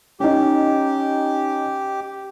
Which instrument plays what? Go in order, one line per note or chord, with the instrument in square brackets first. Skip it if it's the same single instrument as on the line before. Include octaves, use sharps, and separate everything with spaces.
[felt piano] C#4 D#4 [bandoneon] G4